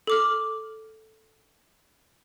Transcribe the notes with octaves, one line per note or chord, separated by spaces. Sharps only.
A4 D6 F6